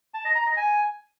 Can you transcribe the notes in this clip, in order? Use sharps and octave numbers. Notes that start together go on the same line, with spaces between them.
A5
D#5
A#5
D#5
G#5